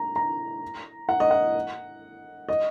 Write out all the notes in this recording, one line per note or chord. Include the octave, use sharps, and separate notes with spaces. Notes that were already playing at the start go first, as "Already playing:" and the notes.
Already playing: A#5
A#5
F#5
D#5
F#5
D#5